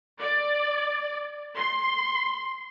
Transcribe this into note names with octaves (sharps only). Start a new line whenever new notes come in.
D5
C6